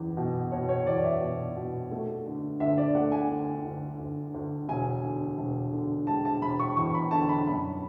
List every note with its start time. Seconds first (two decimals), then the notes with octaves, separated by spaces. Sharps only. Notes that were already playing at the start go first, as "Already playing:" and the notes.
Already playing: F#1 E2
0.17 B2
0.51 B2 C#5
0.69 C#5
0.87 E2 D5
1.04 E5
1.21 B2 D5
1.56 B2
1.91 A3
2.26 D3
2.60 D2 E5
2.78 D5
2.95 A3 F#5
3.12 G#5
3.30 D3
3.64 D2
3.99 D2
4.34 D2
4.69 E1 G#5
5.03 D3
5.38 E1
5.73 D3
6.07 G#3 A5
6.25 A5
6.42 E1 B5
6.59 C#6
6.77 E2 C#6
6.94 B5
7.11 D3 A5
7.29 B5
7.47 F#2 B5